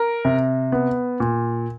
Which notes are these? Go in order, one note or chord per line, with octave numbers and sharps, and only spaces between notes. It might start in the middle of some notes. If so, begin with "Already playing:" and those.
Already playing: A#4
C3
B3
A#2